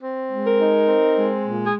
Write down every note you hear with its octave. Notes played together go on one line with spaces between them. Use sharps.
C4
G#3
A#4
D#4
C4
G#3
A#2
G#4